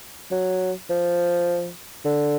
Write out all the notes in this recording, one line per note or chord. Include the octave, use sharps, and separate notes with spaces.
F#3
F3
D3